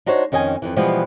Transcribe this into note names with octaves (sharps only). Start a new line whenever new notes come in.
D4 D#4 F#4 C5 C#5
F2 D#3 C#4 D#5 G#5
F2 G#2 E3
B2 E3 F3 G3 G#3 B3